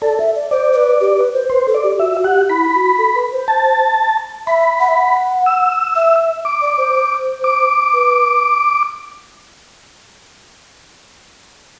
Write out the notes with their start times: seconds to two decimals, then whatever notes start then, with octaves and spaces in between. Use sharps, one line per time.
0.02 A4 D5
0.19 E5
0.35 D5
0.51 C5 D5
0.72 C5
0.76 B4
1.01 G4
1.18 B4
1.33 C5
1.50 B4 C5
1.67 A4
1.75 D5
1.83 G4
1.99 F#4 E5
2.14 F#4
2.24 G4 F#5
2.49 E4 B5
2.74 F#4
2.98 A4
3.15 B4
3.32 C5
3.48 A5
4.47 E5 B5
4.80 F#5
4.88 E5
4.96 F#5
5.46 E6
5.96 E5
6.45 D6
6.62 D5
6.78 C5
6.95 C5
7.44 D6
7.94 B4